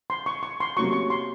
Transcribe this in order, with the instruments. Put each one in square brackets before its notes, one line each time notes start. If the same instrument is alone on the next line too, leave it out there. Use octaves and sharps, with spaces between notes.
[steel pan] C6
C#6
C#6
C6
[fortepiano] C3 F#3 A#3 C#4 F#4 [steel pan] C#6
[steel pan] C#6
C6